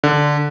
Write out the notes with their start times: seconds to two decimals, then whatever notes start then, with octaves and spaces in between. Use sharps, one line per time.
0.04 D3